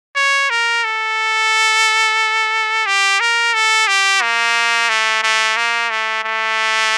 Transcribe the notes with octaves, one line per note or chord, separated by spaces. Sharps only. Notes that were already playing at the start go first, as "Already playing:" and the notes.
C#5
A#4
A4
G4
A#4
A4
G4
A#3
A3
A3
A#3
A3
A3